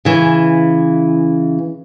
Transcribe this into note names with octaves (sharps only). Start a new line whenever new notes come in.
C#3 E3